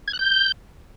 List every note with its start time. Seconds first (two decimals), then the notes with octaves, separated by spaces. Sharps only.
0.08 G#6
0.13 F#6
0.19 G6